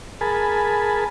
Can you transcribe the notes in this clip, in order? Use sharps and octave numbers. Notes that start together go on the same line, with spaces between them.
G#4 A#4 G#5 A5 B5